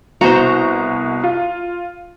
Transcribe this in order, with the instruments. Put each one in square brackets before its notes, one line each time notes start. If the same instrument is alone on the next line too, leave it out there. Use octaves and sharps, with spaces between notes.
[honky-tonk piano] C2 B2 E7 [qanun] F#4 C5 [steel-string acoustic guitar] A#5
[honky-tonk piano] F4